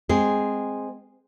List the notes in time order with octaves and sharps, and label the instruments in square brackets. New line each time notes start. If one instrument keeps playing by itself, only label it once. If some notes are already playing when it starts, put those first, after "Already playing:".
[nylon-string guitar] G#3 C4 G#4